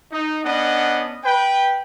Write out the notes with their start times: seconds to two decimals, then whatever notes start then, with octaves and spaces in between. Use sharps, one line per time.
0.12 D#4
0.45 B3 C#4 D4 D#5 F#5
1.25 B4 G5